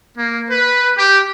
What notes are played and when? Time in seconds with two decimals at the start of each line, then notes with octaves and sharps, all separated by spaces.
0.17 A#3
0.49 B4
0.98 G4